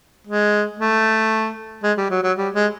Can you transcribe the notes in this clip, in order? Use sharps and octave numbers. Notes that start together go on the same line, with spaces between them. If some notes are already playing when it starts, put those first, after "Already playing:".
G#3
A3
G#3
G3
F#3
F#3
G3
G#3